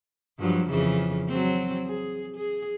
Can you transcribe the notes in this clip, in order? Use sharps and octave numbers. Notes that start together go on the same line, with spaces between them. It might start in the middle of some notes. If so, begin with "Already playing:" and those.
G2 F3 F#3
F2 C#3 E3
F#3 C4
G#4
G#4